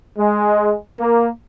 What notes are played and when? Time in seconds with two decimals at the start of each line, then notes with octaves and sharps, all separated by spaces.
0.18 G#3
0.99 A#3